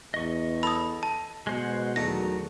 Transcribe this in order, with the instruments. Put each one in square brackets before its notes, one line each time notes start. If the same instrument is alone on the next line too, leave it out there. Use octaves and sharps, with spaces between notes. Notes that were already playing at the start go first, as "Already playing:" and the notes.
[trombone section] E2 [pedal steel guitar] D#5 C#6
[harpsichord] A4 [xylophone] B5 D#6
[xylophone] A5
[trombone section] B2 [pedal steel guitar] G#3 C5 F#5
[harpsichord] E2 A3 [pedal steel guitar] D#3 F#3 F#4 [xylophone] A#6